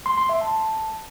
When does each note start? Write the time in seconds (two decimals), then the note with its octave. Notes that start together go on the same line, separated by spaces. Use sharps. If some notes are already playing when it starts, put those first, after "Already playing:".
0.06 C6
0.18 C6
0.29 E5
0.41 A5